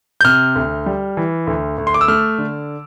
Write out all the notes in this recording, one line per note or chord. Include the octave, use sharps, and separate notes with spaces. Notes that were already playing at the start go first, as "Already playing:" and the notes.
G6
C3 F6
D2
G3
E3
D2
D2
C6
D6
E6
A3 F6
D3